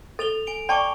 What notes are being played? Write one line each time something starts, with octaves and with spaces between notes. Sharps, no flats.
A4 A6 F7 G7
G#5 D7 G7
D5 G5 A5 B5 C#6 D6